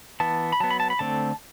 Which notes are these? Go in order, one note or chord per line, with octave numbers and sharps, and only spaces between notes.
E3 B3 A5
B5
F#3 B3 A5
B5
A5
B5
D3 A3 C4 A5